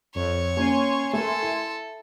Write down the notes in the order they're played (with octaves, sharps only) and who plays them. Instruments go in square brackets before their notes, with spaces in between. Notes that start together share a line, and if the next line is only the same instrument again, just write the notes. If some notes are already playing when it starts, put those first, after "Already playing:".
[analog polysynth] F2 [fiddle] C#5
[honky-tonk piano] A#3 C#4 [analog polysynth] G#5 C6
[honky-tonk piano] A3 A#4 [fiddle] A4
[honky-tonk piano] E4